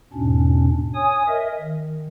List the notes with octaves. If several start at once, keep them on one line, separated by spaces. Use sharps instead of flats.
E2 G#2 B2 C#4 D4
C#5 G#5 D#6
A#4 D#5 E5
D#3